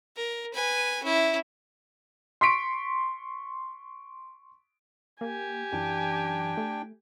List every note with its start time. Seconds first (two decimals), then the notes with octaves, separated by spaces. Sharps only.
0.16 A#4
0.54 B4 G#5
1.03 C#4 E4
2.41 C6 C#6 B6 D7
5.21 A#3 G4 G#5
5.72 F#2 E3 D4 G5
6.57 A3